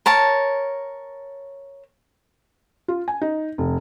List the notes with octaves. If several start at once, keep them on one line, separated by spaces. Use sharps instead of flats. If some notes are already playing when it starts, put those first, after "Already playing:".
A#4 C#5 A5
F4
G#5
D#4
F1